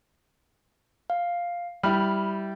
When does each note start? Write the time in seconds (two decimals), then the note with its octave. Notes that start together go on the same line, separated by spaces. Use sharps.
1.10 F5
1.83 G3 E4 B5 F6